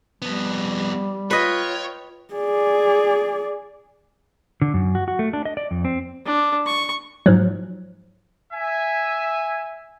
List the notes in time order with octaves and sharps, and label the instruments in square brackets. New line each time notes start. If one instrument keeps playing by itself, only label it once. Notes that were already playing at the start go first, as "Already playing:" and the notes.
[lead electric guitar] F2 B3 [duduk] G3
[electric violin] F4 G5 [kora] B4 D#5 [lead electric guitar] C#5
[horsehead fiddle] G#4 D5
[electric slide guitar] D3
F#2
F#4
F#4
A3
D4
D#5
D5
F2
C4
[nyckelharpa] D4
C#6
[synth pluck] G#2 F3 F#3
[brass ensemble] E5 G#5